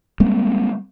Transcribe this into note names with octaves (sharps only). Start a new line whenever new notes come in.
G3 G#3 A#3 C4